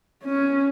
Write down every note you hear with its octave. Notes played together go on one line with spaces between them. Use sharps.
C#4